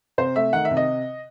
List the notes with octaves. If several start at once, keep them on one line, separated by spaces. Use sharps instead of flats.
C3 C5
A3 E5
D#3 F#5
E5
C3
D#5